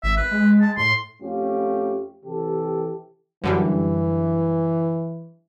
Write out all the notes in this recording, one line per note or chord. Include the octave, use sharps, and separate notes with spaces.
G#1 E5
B4
G#3
A5
A2 C6
F2 A3 C#4 F4 G4
C3 E3 G4 A4
F#2 D3 E3 G3